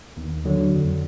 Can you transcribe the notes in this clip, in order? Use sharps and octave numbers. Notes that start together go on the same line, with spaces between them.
D#2
D3 F#3
F2